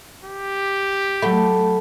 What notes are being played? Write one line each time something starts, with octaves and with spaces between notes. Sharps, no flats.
G4
F#3 A3 F#5 B5